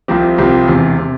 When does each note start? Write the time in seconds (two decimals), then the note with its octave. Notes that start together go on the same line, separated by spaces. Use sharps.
0.08 C2 C3 F3 C4 G4
0.38 C2 C3 F3 C4 G4
0.68 E1 E2 C3
0.98 C3